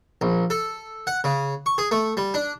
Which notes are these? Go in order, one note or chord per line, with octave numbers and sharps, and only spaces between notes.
A#1
A4
F#5
C#3
C#6
G#4
A3
G3
D4